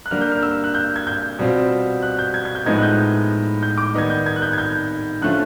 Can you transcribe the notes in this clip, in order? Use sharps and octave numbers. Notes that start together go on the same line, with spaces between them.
F#6
D3 G3 A#3 F6
G6
F6
E6
F#6
G6
G#6
G6
B2 G3 C4 F4
F#6
G6
G#6
G#6
G6
A2 F3 G#3 B3 D#4 G#6
F#6
G6
G6
D6
D#3 G3 B3 D#4 G#6
G6
G#6
F#6
G6
G#6
G6
D3 F3 A3 C#4 F4 F#6